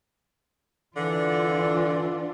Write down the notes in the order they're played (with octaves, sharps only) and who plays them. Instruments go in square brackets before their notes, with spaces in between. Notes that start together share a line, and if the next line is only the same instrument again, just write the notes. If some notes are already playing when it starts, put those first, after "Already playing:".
[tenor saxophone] D3 [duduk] E3 [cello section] D4 F4